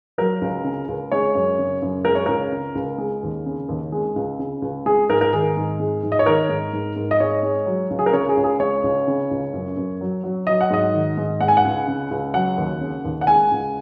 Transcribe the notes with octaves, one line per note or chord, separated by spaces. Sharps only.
F#3 A#4
C#2
C#3
C#2
G#3 C#5
F#2
C#3
F#2
G#3 A#4
C#5
C#2 A#4
C#3
C#2
G#3
D#2
C#3
D#2
G#3
C#2
C#3
C#2
G#3 G#4
G#2 A#4
A#4
D#3 G#4
G#2
G#3
G#2
D#5
C#5
D#3 A#4
G#2
G#2
G#2
D#5
G#3 C#5
G#3
F#3
C#2
G#4
A#4
C#3 C#5
G#4
C#2
G#4
G#3 C#5
C#2
C#3
C#2
F#2
F#2
F#3
F#3
F#3 D#5
F#5
G#2 D#5
D#3
G#2
G#3 F#5
G#5
F#5
C#2
C#3
C#2
F#3 F#5
D#2
C#3
D#2
F#5
G#3 G#5
C#2